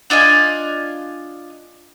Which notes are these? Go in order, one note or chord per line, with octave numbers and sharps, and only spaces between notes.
D4 F4 D#5 G#5